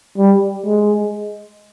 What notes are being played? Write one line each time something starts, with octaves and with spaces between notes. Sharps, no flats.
G3
G#3